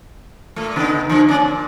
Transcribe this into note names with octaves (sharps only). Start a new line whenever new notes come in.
A#2 A3
C#3 B3 D#4
D3 F3 A#3
C#4 D5
A#2